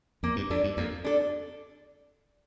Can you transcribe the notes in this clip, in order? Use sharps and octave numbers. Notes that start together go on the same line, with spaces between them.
F2 A#3
G2
F2 D4 A4
G2
F2 A#3
D4 A4